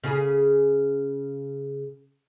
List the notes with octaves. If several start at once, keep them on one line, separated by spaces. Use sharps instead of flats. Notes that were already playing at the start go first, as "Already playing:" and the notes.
C#3 G#4